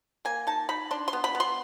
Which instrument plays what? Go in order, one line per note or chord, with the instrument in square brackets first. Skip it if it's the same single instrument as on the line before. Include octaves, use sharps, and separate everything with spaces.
[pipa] A#3 G#5
D#4 A5
D#4 B5
D4 C6
C6
B3
B5
B3
C6